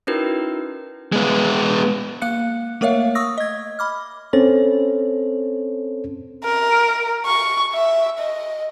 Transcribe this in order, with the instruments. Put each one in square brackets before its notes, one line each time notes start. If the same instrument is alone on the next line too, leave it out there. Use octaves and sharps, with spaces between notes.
[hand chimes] C#4 D#4 E4 F#4 A#4 B4
[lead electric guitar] G#3 B3
[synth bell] A#3 F5 F#6 C#7
A3 A#3 A#4 C#5 E5 F5
C#6 D#6 E6 A#6
D#5 G#6
B5 D6 F6
[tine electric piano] C4 C#4 A4 C5 C#5
[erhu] A#4
C#6
E5
D#5